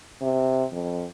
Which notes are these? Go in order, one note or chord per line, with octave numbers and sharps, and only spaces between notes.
C3
F2